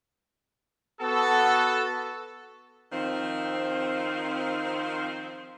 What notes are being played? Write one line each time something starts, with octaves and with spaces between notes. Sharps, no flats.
B3 F#4 A4
D#3 F3 C4